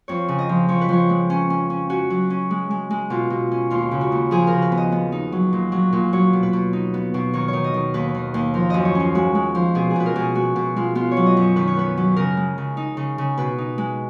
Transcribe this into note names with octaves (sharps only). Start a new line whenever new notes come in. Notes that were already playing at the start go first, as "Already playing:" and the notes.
F2 C#5
C#3
D#5
F3
F3 C#5
B4
F3 C#5
G#3
C#4
C#4
C#4
C#4 F#4
F#3
C#4
G#3
G#3
G#3
B2 F4
B2
C#4
D#2 F4
C#3
F#4
D#2
F3 G#4
A#4
C#3
B4
B3
D#5
B3
D#4
F#3
A#2
F#3
A#2
F#3 C#5
B2
B4
B2
D#4
B3
B2
D#3 C#5
D#3 C#5
D#5
D#3
D#2 B4
D#3
D#2
F3 A#4
F#2 D#5
C#5
C#4 F4
G#3 F#4
G#3
F3
B2 G#4
G#4
B2 B4
A#4
B2 G#4
G#3 F#4
B2
G#3 F4
B3 F4
C#5
F#3
D#5
F#2
C#5
D#3 B4
C#5
B3 B4
F#3
C#3 A#4
G#3
C#3
D#4
C#3
C#3
B2 B4
D#4
G#3